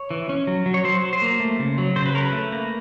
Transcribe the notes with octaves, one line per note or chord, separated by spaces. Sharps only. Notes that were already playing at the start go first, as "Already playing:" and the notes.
Already playing: C#5
E3
C#4
F#3
F#3
C#5
F#3 C5
F#3
C5
A#3
A3
C#3
F#3
C#3 C5
B4
C#4 A#4
B4
A3
A#3